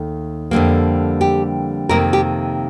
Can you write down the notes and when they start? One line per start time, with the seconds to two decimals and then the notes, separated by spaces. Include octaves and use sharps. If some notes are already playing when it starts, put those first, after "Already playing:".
Already playing: D#2 D#3 A3
0.51 F2 D3 G3 A#3
1.21 G4
1.89 F2 C3 D#3 A#3 A#4
2.13 G4